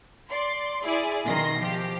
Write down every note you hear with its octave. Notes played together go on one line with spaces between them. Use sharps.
D5 C6
E4 G#4 D5
B2 D#3 C6 A#6 C7
F3 G4